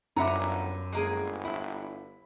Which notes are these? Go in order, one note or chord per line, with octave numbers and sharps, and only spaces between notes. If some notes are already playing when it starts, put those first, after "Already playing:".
G1 F#2 E5 F#5 A#5 B5 D6
G1 G#3 A#3 G#4
E4 B5